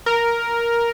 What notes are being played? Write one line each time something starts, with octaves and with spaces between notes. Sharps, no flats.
A#4